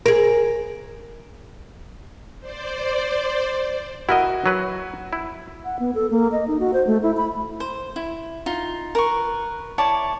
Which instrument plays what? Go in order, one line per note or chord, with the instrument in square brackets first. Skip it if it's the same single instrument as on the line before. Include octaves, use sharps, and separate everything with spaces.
[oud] G#4 A#4
[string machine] C5 D5
[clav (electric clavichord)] E4 A#4 D#5 [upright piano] F#4
[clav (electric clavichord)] F#3 B4
E4
[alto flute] F#5
B3
A4
A#3
D#5
D#4
F#4
C5
A3
E4
B5
[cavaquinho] C5
E4
D#4 F4
A#4 B4 C#6
E4 C#5 D5 A5